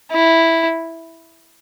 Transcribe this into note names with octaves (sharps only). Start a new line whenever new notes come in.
E4